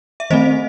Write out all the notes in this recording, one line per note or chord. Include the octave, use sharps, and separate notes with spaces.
E5
D#3 A3 C4 C5 D#5